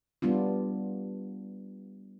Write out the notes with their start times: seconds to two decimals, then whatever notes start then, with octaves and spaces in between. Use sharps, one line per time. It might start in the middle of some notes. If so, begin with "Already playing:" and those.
0.22 G3 B3 D4 F4